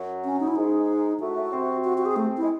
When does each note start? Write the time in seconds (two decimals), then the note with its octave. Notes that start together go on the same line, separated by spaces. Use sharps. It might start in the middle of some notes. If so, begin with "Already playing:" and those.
Already playing: F#2 F#3
0.25 C#4
0.40 D#4
0.48 E4
0.55 G#2 G#3 D#4
1.20 A2 A3 F#4
1.36 A2 A3
1.52 C3 C4
1.84 F#4
1.98 F#4
2.05 G#4
2.16 A3
2.37 E4
2.43 G#3